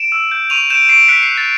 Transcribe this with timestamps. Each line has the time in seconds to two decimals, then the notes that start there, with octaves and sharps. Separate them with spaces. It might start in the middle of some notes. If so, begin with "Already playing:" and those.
Already playing: D7 E7
0.12 E6
0.31 G6
0.50 C#6 D#7 F7
0.70 G6 D7 E7
0.89 C#6 C7 D7
1.08 F#6 B6 C#7
1.23 F#6 C7
1.37 A6